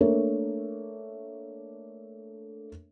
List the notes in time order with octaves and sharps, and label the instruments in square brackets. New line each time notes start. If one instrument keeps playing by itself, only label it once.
[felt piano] A3 A#3 D4 A#4 C#5 E5